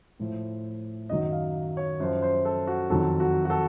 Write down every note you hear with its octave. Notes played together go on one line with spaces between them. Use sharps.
A2 F3
F#2 D#3 F#3 D#5
F5
C#5
F#2 F3 C5
C5
A4
F#4
F2 D#3 F#3 A4
F#4
F#4
A4